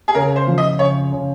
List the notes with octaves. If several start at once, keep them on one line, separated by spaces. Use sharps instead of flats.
G#4
C#3 A#4
C5
F3
D#5
C#3 C#5
C#3